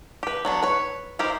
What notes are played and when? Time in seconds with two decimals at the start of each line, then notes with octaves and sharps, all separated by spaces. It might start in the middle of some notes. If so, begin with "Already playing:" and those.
0.23 G4 B4
0.45 F#3 B3 D4
0.63 B4 C#5
1.19 D#4 E4 G4 A#4 C5